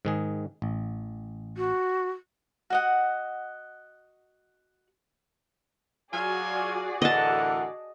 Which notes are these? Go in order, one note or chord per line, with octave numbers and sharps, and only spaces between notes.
G#2 D#3 G#4
A1
F#4
F#4 D#5 F#5
F#3 F4 F#4 G#4 D5 G#5
A2 D3 E3 A4 A#4 D#5 F#5 A5